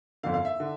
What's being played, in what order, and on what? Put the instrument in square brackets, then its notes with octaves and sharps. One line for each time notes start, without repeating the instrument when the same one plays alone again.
[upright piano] G1 F2 D3 F5
F5
E5
D3